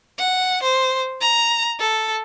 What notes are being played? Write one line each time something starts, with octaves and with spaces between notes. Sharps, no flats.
F#5
C5
A#5
A4